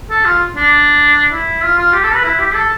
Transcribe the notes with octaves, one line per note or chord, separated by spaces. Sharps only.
A4
F4
D4
E4
F4
F4
G4
A4
B4
E4
G4
A4